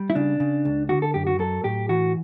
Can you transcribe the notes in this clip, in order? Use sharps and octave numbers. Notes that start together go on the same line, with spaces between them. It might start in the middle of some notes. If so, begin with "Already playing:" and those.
Already playing: G3
E4
C#3 D4
C#3
C#2
D3 F#4
A4
F#2 G4
F#4
F#3 A4
A2 G4
E3 F#4